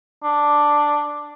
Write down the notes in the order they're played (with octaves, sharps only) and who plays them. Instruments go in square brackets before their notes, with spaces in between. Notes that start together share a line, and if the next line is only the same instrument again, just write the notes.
[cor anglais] D4